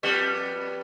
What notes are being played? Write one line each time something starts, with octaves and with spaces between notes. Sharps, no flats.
F2 G3 B3